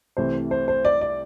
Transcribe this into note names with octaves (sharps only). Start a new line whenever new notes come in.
C2 C3 E3 A3 C5
C5
C5
D5
D5